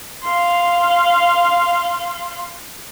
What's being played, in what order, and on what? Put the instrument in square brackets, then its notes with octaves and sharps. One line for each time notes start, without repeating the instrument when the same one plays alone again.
[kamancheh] F5 C6